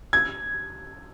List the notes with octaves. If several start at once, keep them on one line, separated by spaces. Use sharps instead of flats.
G#6